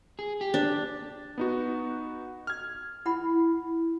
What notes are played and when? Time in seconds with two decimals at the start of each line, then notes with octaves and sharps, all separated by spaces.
0.19 G#4
0.41 G4
0.54 D4
1.38 B3 D#4 F#4
2.47 F6 G#6
3.06 E4 F#5 B5